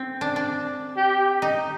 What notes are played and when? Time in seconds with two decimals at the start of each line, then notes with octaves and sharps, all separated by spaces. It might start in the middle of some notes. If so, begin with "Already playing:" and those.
Already playing: C4
0.21 D4
0.36 D4
0.97 G4
1.42 D#4